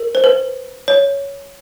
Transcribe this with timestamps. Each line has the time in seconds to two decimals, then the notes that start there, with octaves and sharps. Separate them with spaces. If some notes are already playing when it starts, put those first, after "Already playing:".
Already playing: A#4
0.15 C5
0.24 B4
0.88 C#5